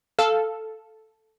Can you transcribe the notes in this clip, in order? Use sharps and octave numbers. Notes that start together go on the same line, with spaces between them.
A4 F5 E6